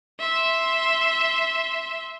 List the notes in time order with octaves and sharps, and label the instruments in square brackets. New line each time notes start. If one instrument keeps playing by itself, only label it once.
[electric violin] E5 C6